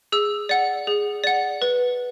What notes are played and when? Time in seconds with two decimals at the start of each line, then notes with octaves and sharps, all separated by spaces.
0.12 G#4 E6
0.49 D5 F#5
0.87 G#4
1.24 D5 F#5
1.62 B4